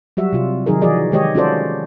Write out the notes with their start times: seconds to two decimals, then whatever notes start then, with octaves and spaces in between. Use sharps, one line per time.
0.17 F#3 G3 F#4 E5
0.33 C3 F4
0.66 D#3 F#3 D#4 G#4 A#4
0.82 E3 F3 F#4 G#4 D5 D#5
1.12 D#3 G#3 G4 C#5 D#5
1.35 C#4 F4 F#4 A4 C5 D5